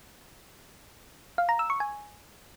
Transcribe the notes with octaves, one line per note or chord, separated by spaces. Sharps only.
F5
A#5
E6
C#6
G#5